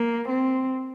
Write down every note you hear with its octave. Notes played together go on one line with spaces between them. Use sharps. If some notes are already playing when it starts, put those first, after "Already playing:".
Already playing: A#3
C4